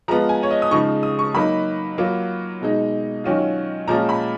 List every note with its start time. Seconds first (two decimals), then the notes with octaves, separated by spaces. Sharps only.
0.08 F3 G#3 B3 F4 A#5
0.29 G#5
0.43 C#5
0.51 D#5
0.62 D#6
0.71 C#3 F3 G#3 D#4 C#6
1.03 D#6
1.19 C#6
1.35 F#3 A#3 D#4 B5
1.98 F#3 A#3 F4
2.61 B2 G#3 D#4
3.24 D#3 F#3 C#4 F4
3.87 A#2 F3 G#3 C#4 F4 A#5
4.09 B5